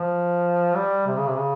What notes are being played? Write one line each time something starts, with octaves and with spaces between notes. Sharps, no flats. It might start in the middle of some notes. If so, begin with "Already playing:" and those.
Already playing: F3
G3
C3
C#3
C3
C#3